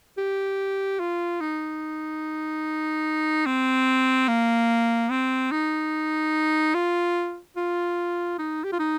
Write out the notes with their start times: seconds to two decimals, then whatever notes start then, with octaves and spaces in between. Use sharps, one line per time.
0.18 G4
1.00 F4
1.41 D#4
3.46 C4
4.28 A#3
5.10 C4
5.51 D#4
6.75 F4
7.56 F4
8.39 D#4
8.64 G4
8.72 F4
8.79 D#4